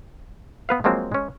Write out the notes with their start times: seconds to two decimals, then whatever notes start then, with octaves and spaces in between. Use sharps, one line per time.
0.69 B3 B4 F5
0.84 F3 F#3 G#3 A#3 C4 F4
1.12 G#3 C#4